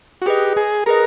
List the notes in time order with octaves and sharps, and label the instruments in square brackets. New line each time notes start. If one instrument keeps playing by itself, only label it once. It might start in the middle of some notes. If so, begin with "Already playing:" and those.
[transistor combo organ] F#4
[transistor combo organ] G4 [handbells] G#4 B4 D#5
[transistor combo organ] G#4
[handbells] G#4 B4 D#5 [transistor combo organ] A#4